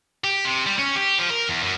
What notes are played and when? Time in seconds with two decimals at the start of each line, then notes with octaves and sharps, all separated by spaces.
0.24 G4
0.45 C3
0.66 G3
0.79 C#4
0.96 G4
1.18 F3
1.30 A#4
1.48 E2
1.63 F#2